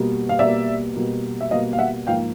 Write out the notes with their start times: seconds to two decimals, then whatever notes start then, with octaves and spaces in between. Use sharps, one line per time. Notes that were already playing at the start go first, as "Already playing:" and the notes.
Already playing: B2 G3 A#3
0.29 F5
0.39 B2 G3 A#3 D5 E5
0.96 B2 G3 A#3
1.41 E5
1.51 B2 G3 A#3 D#5 F5
1.73 F5
1.79 E5 F#5
2.07 G#2 F3 A#3 F5 G5